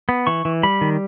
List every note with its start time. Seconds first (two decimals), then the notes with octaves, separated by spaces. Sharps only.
0.09 B3
0.27 E3 C#6
0.45 E3
0.63 G3 B5
0.81 D#3